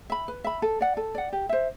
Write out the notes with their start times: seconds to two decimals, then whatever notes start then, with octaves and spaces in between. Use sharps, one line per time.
0.10 E5 B5
0.28 B4
0.44 E5 B5
0.62 A4
0.81 D5 F#5
0.97 A4
1.15 D5 F#5
1.33 G4
1.49 C5 E5